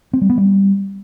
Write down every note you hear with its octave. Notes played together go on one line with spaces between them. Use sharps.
C4
G3
B3
G3